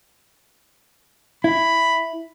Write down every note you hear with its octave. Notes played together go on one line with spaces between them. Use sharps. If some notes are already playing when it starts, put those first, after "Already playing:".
E4 B5